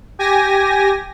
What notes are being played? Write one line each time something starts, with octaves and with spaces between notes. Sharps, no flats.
G4 G#5 A#6